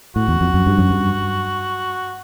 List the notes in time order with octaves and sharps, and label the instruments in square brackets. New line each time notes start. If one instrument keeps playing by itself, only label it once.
[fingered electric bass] A2 [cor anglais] F#4
[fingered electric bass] E2
F2
F#2
G2
F#2
G2